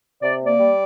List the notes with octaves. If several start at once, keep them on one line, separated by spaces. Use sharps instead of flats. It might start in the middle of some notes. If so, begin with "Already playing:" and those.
C3 D5
A#3
D5
G3